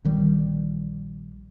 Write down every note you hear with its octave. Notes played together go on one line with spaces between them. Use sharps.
A#1 D#3 G3